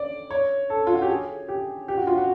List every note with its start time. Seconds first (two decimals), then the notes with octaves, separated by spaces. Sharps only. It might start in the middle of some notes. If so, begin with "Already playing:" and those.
Already playing: D5
0.31 C#5
0.70 A4
0.87 F4
0.94 F#4
1.02 G4
1.09 G#4
1.49 G4
1.88 G4
1.98 F#4
2.07 F4
2.17 F#4